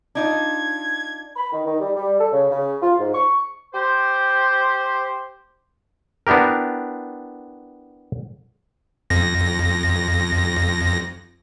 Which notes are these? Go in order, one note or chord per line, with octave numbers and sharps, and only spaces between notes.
D4 D#4 F4 G#6
B5
D#3
D#3
G3
G3
A4
C#3
C#3
F4
G#2
C#6
G4 C5
B3 D4 E4 G4 A#4
F2 A#6